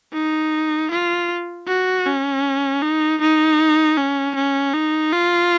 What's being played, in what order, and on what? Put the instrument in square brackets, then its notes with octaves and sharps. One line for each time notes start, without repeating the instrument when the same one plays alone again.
[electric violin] D#4
F4
F#4
C#4
D#4
D#4
C#4
C#4
D#4
F4